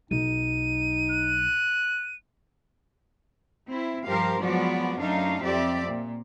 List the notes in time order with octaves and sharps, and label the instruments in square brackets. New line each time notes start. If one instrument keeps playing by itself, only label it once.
[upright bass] B1 [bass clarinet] D#4 [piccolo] D#7
[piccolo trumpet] F#6
[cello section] C4 E4
G2 F3 G4 A#4 C5 F5
F3 F#3 G#3 B3 F#4 D5
F#2 F#3 A3 D4 D#4 F5
F2 C4 G4 D5 E5
A#2